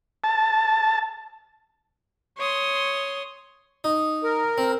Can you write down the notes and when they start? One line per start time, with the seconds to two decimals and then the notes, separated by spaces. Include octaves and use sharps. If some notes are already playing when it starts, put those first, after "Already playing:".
0.24 A5
2.38 C#5 C6 D#6
3.84 D#4
4.24 A#4
4.58 C4